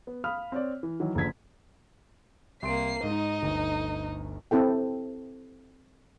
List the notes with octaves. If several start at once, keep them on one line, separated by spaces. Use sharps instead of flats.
B3
F5 B5 D#6 F6
C4 C#5 D5
E3
D#3 E3 F#3
F#1 D3 F3 G#6 B6
C2 A#3 C6 C7 D7
G#2 D#4 D#5
G1 D2
C4 E4 A4 G5